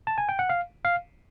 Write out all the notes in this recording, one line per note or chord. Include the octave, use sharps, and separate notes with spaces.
A5
G#5
G5
F#5
F5
F5